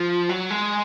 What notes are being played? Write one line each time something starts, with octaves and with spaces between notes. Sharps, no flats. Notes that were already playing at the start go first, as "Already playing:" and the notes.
Already playing: F3
F#3
G#3